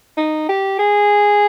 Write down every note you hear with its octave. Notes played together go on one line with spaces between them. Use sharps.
D#4
G4
G#4